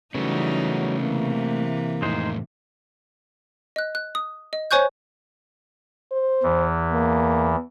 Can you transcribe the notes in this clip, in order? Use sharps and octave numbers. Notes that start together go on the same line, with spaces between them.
C#3 E3 F#3 G3 A3 B3 D#4
C3 E3 A#3
F2 A2 G#3 D#4 C5
D#5 F#6
F#6
D#6
D#5
C5 C#5 G#5 C#6 F#6 G6
C5
E2 E3
A#3